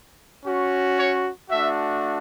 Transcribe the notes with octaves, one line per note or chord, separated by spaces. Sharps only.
C#4 F#4
C#5
A3 D4 F#4 E5